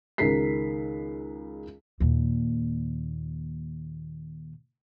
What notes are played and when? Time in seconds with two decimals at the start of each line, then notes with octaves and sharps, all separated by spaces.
0.18 C#2 D#3 G#4 A#4 B6 C7
2.00 D#2 A#2